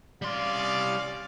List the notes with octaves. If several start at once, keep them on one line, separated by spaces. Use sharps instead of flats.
G3 C#4 D5 F5 C6